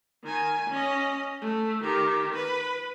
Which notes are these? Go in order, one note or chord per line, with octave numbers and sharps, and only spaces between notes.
D#3 G#5
C#4 D#5
A3
D#3 G4
B4